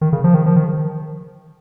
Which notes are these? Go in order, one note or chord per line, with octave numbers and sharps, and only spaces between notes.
D#3
C#3
F3
D#3
F3
D#3